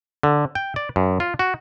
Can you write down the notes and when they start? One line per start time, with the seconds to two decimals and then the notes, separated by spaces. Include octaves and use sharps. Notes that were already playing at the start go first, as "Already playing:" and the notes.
0.23 D3
0.55 G5
0.76 D5
0.96 F#2
1.20 F4
1.39 F#4